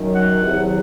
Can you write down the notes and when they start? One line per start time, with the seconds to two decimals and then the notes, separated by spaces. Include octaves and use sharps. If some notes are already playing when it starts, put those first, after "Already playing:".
Already playing: F#2 D#3 F#3
0.15 F#5
0.41 E2 C3 D#3 F#3